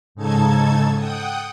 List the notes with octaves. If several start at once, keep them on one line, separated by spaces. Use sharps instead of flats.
G#2 C#3 D#4 A4 A5 G#6
F#5 G5 D#6